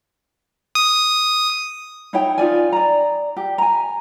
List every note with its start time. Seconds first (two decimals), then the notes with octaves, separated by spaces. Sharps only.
0.75 D#6
2.13 D#4 E4 C#5 G5
2.38 D#4 F4 D5 G#5
2.73 D5 A#5
3.37 G4
3.58 G#5 A#5